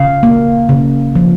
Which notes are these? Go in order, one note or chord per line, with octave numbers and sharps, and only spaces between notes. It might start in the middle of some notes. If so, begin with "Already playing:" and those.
Already playing: C#3 F5
A#3
C#3
F3